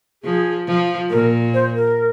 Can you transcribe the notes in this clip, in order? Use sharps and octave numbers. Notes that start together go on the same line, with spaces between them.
F3 G#4
F3
A#2 A#4
C5
A#4